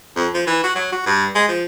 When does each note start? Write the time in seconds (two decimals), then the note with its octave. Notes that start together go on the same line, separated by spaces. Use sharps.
0.16 F2
0.34 F3
0.47 E3
0.63 F#4
0.75 F#3
0.92 F#4
1.06 G2
1.35 G#3
1.48 F3